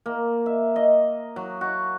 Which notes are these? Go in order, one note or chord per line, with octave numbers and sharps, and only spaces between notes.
A#3
E5
D#5
F#3
F#4